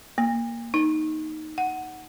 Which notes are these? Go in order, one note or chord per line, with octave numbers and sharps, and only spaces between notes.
A#3
D#4
F#5